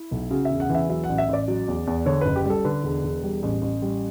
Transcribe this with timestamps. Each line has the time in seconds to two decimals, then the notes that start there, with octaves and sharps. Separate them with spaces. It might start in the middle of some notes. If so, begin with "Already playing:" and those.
Already playing: E4
0.11 B1
0.31 C#3 F#4
0.45 E5
0.50 E1
0.60 F#5
0.69 E3
0.75 E5
0.89 F#3 E5
1.04 F#5
1.09 A1
1.18 E5
1.28 A1 D5
1.48 F#3
1.68 E2
1.87 E2
2.06 D3 C#5
2.21 F#1 B4
2.36 G4
2.45 G3 A4
2.65 D3 B4
2.84 E1
3.04 E1
3.23 G3
3.43 A1
3.62 A1
3.82 G3